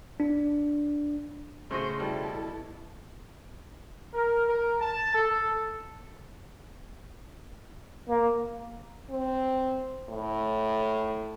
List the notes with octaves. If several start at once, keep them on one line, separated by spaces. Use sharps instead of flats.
D4
A2 C#3 A3 F#4 C5 D#5
B2 G3 E4 A4
A#4
A#4
A5
A4
A#3
C4
A2